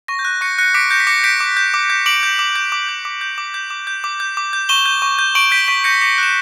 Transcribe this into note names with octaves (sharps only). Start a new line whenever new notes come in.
C#6 A#6
G6
F#6 A#6
C#6 A#6 C#7
F#6 A#6 C#7
D6 B6 D7
G6 A#6 C#7
B6
D6 A#6 C#7
G6 B6 D7
D6
G6
D6
G6
D6 D7 F#7
G6
D6
G6
D6
G6
D6
G6
D6
G6
D6
G6
D6
G6
D6
G6
C#6 E7 G7
G6
C#6
G6
C#6 D7 F#7
G6 B6 D7
C#6 B6 D7
G6 A#6 C#7
D6 A#6 C#7
F#6 E7